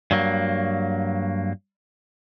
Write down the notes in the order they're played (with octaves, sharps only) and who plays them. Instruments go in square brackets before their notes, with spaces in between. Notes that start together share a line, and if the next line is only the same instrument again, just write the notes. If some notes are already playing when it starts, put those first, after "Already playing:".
[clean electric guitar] G2 F#3 A#3